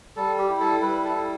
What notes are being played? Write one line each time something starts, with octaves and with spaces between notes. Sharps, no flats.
G3 A4
G4
E4
A4
G3 B4
A4
E4